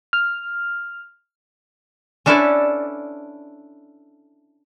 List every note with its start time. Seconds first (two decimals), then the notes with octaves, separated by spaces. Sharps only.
0.13 F6
2.26 C#4 D4 E4 A4 B4 D5